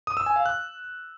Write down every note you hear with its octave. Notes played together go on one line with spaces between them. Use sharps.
D#6
E6
G#5
F5
F#6